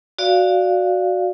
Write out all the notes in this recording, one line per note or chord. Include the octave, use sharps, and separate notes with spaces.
F#4 D5 F5